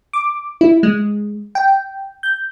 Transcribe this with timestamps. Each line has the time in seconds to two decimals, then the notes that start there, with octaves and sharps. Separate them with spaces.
0.13 D6
0.61 E4
0.83 G#3
1.55 G5
2.23 G6